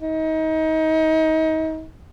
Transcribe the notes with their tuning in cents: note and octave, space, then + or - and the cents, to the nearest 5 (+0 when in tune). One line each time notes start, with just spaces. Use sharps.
D#4 +30